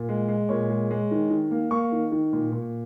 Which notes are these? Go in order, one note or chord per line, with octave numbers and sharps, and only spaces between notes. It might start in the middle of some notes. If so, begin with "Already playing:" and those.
Already playing: A#2
G#3
G#3
A#2 C#5
G#3
G#3
D#3
D#3
A#3
A#3 C#6
D#3
D#3
A#2
A#2